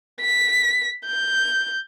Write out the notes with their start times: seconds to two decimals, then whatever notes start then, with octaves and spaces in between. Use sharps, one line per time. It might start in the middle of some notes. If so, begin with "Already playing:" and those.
0.20 B6
1.06 G6